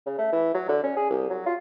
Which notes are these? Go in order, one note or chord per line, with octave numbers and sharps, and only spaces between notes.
C#3
A3
E3
F#3
D3
C#4
G#4
C2
F#3
F4